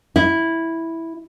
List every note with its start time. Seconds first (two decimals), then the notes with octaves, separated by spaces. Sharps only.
0.16 E4